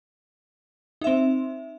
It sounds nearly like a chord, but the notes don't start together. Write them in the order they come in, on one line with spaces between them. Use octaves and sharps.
D#4 E5 C4